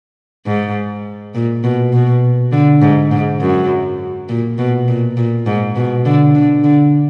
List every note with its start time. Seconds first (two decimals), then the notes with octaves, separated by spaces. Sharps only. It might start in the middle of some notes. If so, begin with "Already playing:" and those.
0.46 G#2
1.35 A#2
1.64 B2
1.93 B2
2.52 D3
2.81 G#2
3.11 G#2
3.40 F#2
4.29 A#2
4.58 B2
4.88 A#2
5.17 A#2
5.46 G#2
5.76 B2
6.05 D3
6.35 D3
6.64 D3